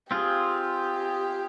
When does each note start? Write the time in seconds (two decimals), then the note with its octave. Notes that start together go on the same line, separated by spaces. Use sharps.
0.11 C4 F4 G4 G#4